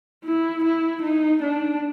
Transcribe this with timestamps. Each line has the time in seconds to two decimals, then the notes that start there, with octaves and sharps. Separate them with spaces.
0.24 E4
0.64 E4
1.03 D#4
1.43 D4